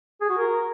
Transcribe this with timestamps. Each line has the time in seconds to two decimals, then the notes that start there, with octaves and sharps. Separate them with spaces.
0.21 G#4
0.30 F#4
0.38 A#4